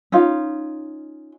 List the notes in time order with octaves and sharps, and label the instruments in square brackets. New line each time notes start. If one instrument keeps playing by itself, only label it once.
[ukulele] C#4 D#4 F4